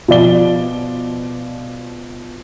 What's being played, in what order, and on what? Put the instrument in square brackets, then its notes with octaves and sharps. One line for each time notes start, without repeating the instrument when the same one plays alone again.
[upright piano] B2 F3 D5 G7